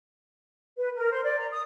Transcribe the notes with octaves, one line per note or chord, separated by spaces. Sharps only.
B4
A#4
C5
D5
A#5
D#6